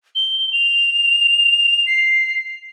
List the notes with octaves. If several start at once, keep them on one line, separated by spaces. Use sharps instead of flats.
G7
F7
C7